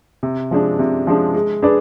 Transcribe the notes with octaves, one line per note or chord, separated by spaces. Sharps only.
C3
F3 G#3 D4
C3
F3 G#3 D4
G#3
D4 G#4 B4 D5